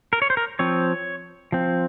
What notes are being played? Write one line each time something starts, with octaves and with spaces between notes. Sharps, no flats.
A#4
C#5
C5
A#4
F3 C4 C#5
F3 C4